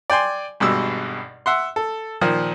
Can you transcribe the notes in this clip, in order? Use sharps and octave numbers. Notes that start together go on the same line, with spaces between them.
D5 G5 G#5 C6
G#1 G2 B2 E6
E5 F#5 C6
A4
A#2 D#3 F3